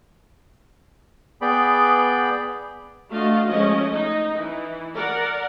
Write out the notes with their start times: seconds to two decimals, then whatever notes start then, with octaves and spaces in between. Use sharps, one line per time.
1.42 B3 G#4 D5 G5 B5
3.12 A3 D4 F4 F#4 D#5 F5
3.48 F3 G#3 A3 C#4 D#5
3.94 D#4
4.35 E3
4.94 A#4 D5 F#5